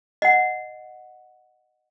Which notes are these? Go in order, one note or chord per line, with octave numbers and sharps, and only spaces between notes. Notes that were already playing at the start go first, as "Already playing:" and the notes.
D#5 F#5